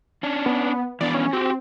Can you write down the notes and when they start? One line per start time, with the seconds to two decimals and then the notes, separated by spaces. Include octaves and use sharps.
0.23 C#4 D4
0.46 B3
1.01 E3 B3 D4 D5
1.14 C#4
1.33 C4 F#4 G4